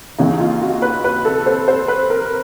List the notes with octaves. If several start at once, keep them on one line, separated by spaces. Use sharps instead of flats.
D#2 C#3 E3 D#4
F4
F#4
B4
B4
A4
C5
C5
B4
A#4